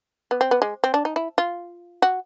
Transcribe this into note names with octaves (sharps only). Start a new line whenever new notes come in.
B3
C4
B3
G#3
C4
D4
D#4
E4
F4
F#4